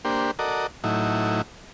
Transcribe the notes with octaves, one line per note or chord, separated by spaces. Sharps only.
A#3 D4 G4 C5
F#4 A4 A#4 D5 D#5
A2 F#3 D#4 E4